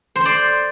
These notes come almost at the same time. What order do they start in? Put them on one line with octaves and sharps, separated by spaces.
C5 C6 D5